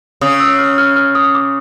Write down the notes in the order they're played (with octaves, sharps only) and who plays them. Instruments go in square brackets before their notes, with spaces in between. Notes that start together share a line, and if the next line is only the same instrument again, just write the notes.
[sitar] C#3 [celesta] D#6
[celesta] E6
F6
F6
F6
D#6
D6